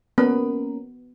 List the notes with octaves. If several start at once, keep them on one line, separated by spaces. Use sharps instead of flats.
A#3 B3 C#4 A#4